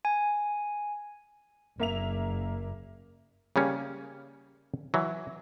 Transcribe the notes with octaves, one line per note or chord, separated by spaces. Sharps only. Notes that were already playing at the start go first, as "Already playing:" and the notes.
G#5
F#1 A#3 E5 F7
C#3 G3 A#3 C#4
E3 F#3